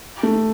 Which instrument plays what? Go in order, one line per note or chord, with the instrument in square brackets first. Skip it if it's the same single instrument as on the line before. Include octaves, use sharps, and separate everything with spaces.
[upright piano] A3